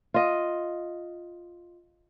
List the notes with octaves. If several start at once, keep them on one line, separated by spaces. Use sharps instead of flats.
F4 D#5